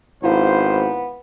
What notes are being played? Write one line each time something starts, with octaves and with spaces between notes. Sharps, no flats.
G#1 B3 E4 C5 F5